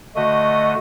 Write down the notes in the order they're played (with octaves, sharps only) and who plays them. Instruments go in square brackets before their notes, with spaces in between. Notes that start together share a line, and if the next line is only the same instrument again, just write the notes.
[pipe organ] D3 A3 F#4 [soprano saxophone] D#5